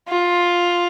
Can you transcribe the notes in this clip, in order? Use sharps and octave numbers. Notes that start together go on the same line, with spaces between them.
F4